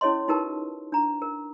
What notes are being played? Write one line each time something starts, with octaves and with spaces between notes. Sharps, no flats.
C#4 E4 A4 C#5 D#5 C6
D#4 F4 G4 A#4 B4 A5
D4 A#5
A#4